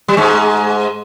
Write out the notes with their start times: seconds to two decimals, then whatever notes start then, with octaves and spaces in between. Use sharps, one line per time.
0.08 G3
0.17 G#2 G#3